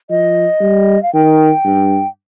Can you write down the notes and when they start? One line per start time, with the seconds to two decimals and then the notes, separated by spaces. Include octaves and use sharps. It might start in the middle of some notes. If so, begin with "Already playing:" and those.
0.10 F3 D#5
0.61 G3
1.03 F5
1.14 D#3 G5
1.65 G2